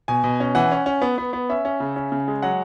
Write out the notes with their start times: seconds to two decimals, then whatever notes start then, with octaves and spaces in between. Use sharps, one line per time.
0.08 B2 G#5
0.24 B2
0.40 C#4
0.55 E3 F#5
0.72 C#4
0.86 C#4
1.02 B3
1.18 B3
1.33 B3
1.49 C#4 E5
1.65 C#4
1.80 C#3
1.96 C#4
2.12 C#3
2.28 G#3
2.43 F#3 F#5